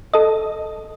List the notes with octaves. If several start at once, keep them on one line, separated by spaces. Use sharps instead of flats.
A4 D#5